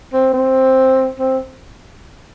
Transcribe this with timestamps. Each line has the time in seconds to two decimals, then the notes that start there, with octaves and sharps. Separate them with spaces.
0.13 C4
0.33 C4
1.19 C4